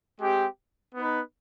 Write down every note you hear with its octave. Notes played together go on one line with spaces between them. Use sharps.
G#3 C4 G4
B3 D#4 B4